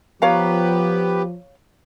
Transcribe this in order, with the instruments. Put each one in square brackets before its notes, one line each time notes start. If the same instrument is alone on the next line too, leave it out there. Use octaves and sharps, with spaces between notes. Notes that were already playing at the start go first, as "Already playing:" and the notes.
[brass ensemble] F3 [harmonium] B3 G4 B4 [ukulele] C#5 F5 A#5